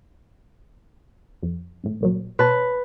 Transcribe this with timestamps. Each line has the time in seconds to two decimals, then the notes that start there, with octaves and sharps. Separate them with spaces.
1.42 F2
1.84 G#1 A2
2.01 C#2 A#2 F#3
2.39 B2 B4 C#5 A5